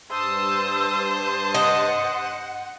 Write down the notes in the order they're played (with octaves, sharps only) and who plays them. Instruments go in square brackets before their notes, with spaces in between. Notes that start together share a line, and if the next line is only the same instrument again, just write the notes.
[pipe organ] G2 A5 D#6 [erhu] C5 [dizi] E6
[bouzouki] D#5 [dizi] F#5